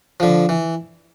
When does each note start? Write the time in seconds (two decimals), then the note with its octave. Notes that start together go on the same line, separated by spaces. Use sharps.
0.20 D3 F3
0.49 E3